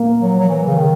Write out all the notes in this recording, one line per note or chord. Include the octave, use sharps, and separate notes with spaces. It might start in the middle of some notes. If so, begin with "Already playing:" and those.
Already playing: A#3
F#3
F#3
E3
C#3
D#3